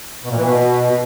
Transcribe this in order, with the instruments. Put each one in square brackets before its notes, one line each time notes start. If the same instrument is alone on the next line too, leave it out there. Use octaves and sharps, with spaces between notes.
[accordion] B2
A#2
E3
B2